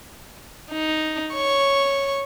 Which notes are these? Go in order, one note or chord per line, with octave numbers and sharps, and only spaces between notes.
D#4
C#5 C#6